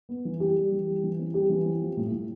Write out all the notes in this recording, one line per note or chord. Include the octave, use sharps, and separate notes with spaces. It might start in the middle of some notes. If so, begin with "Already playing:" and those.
B3
E3
G3 G4
G3
E3
G3
E3
C4
G3 G4
E3
C4
F3
A2
A2